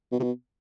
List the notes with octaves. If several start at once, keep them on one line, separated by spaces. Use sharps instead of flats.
B2
C3
B2